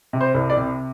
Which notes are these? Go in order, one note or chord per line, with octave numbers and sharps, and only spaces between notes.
C3
C5
C2
D5
C3